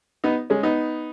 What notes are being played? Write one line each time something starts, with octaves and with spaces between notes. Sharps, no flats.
B3 D#4
G#3 C#4
B3 D#4